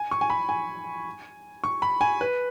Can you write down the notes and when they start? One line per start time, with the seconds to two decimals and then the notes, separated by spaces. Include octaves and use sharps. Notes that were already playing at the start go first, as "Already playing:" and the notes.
Already playing: G#5
0.11 C#6
0.21 G#5
0.30 B5
0.49 G#5
1.64 C#6
1.82 B5
2.01 G#5
2.21 B4